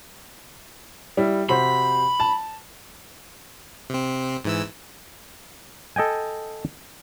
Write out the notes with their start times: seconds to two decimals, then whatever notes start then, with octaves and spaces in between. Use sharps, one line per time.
1.17 G3 E4
1.49 C3 F#4 C5 B5
2.20 A5
3.90 C3 C4
4.45 G#2 E3 E6
5.96 A4 D#5 G5 G#5